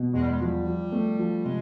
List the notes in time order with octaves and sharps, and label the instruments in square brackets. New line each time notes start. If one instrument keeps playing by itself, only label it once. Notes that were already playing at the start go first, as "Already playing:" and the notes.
Already playing: [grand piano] B2
[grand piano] E2 [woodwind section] G#3
[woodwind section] G3
G#3
[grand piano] F3 [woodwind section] G3
[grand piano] F3
A3
F3
[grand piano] C3 [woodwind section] G#3